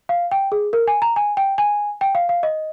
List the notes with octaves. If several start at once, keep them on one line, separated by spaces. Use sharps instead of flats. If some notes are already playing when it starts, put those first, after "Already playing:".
F5
G5
G#4
A#4
G#5
A#5
G#5
G5
G#5
G5
F5
F5
D#5